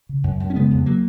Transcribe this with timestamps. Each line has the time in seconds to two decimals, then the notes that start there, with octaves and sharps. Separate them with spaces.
0.09 C#3
0.24 F#2
0.40 F#2
0.50 C#4
0.55 C#3 G#3 B3
0.71 F2
0.86 F#3 A#3